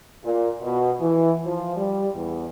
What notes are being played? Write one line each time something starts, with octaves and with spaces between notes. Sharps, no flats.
A#2
B2
E3
F3
G3
E2